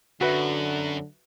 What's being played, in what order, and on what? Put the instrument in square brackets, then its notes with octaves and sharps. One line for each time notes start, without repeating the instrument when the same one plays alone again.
[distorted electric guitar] F#2 [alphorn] D3 [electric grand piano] F#4 B4 E5